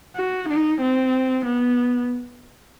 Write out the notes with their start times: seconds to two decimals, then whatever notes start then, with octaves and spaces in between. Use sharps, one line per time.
0.16 F#4
0.49 D#4
0.81 C4
1.45 B3